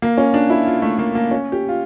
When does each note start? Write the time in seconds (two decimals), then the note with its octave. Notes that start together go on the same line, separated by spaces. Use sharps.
0.02 A#3
0.17 C#4
0.34 D4
0.50 E4
0.66 F4
0.82 A3
0.99 A#3
1.15 A#3
1.31 C#4
1.52 G4
1.69 F4